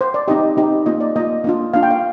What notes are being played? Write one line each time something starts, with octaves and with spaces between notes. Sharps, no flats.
C5
D5
C4 D#4 G4 D#5
C4 D#4 G4
A#3 F4 D#5
D5
A#3 F4 D#5
A#3 D4 F4
A#3 D4 F4 F5
G5
F5